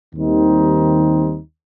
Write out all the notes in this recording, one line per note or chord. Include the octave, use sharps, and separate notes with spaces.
D#2 D#3 G3 C4 D#4